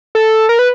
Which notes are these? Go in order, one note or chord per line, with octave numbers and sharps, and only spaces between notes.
A4
A#4
B4